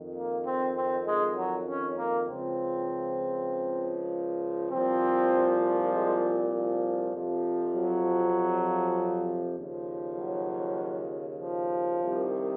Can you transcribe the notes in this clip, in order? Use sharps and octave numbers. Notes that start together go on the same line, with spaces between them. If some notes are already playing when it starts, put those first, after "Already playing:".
Already playing: F2 D#3
A#3
C4
C4
G#3
F#3
C#4
A#3
C#2 C#3 F3 C4
C2 A#2 F3 C4
G#3
F3
F2 C3 F3
F#3
D#2 C#3 F3
F#3
F3
C2 C3 D#3